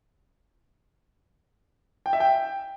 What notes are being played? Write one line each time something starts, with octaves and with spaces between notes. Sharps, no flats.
G5
E5
G5